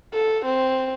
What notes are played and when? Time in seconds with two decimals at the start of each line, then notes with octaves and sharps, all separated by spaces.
0.13 A4
0.45 C4